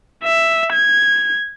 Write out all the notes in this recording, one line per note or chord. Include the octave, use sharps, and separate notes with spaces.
E5
G#6